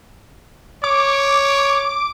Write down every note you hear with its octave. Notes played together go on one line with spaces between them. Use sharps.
C#5 D6